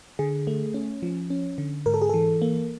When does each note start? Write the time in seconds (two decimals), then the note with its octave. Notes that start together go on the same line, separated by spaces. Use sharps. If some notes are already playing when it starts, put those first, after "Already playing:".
0.19 D3 G#4
0.47 A3
0.74 C#4
1.03 F3
1.30 C#4
1.58 D3
1.86 G#2 A#4
1.94 A4
2.02 G#4
2.09 E3 A4
2.42 A#3